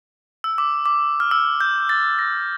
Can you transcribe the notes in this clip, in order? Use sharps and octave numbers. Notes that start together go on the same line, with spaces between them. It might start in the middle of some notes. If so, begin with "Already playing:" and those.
E6
D6
D6
F6
E6
G6
A6
A#6